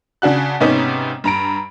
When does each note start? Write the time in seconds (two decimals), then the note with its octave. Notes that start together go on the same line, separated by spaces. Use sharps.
0.22 C#3 D4 F#4 F#6
0.60 G#2 C3 B3 C#4 D#4
1.24 G2 A#5 D7